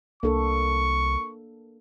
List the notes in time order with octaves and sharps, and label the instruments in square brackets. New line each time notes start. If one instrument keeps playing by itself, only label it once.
[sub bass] C2 [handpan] A#3 D4 A4 [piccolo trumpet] C#6